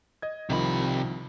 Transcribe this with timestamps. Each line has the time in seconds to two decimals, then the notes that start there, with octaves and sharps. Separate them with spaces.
0.22 D#5 G#6
0.50 C2 C3 D#3 F3 B5